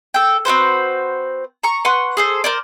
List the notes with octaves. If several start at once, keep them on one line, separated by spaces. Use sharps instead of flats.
A4 G5
C4 F#4 B4 C5
A#5 C#6
B4 F#5 C6 C#6
G#4 A4 C5
A#4 C5 D5